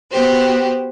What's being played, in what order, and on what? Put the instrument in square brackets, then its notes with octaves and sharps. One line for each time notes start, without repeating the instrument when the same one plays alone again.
[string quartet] B3 F#4 G4 C5